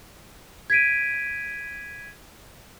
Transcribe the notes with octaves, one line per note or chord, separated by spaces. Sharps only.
G#6 B6 D7 D#7